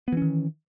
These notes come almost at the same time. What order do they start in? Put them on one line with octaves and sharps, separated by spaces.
B3 E3 C#4 D#3